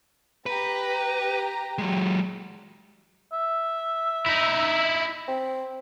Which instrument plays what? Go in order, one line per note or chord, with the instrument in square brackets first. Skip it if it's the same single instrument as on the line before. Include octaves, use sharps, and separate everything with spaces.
[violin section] G4 A#5 [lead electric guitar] B4
[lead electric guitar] F#3 G#3
[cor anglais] E5
[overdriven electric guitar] D#4 E4
[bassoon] C4